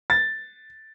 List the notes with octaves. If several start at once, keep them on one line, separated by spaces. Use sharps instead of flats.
A6